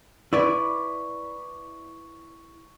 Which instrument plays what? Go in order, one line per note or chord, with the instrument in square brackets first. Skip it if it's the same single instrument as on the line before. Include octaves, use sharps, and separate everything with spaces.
[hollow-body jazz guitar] E4 B4 D5 [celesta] C#6